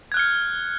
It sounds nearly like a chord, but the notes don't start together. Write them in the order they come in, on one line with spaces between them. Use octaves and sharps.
G#6 F#6 F6 C#7